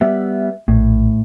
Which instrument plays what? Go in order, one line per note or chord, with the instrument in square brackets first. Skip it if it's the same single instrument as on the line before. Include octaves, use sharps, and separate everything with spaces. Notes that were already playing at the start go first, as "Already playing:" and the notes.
[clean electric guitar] G3 B3 [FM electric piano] E5
[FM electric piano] A#1 [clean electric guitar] A2